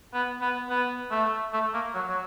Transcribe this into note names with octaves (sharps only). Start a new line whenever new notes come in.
B3
B3
B3
A3
A3
A#3
F#3
F#3